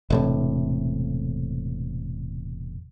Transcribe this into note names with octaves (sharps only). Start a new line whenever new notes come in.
E1 A2 C3